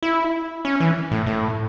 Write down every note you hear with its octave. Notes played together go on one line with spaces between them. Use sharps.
E4
C#4
E3
A2
A2